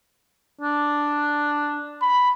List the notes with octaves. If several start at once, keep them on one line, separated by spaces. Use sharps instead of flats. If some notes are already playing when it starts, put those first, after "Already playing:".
D4
B5